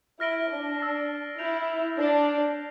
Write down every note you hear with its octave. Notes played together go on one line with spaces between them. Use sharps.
E4 F6 A#6 D7 G7
D4
E6 A6 C7
E4 G6 D7 F7
D4 E6 A6 C7 G7